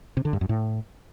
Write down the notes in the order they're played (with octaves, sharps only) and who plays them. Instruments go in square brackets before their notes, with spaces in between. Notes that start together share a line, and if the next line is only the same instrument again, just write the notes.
[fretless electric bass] C3
D3
G2
F#2
A2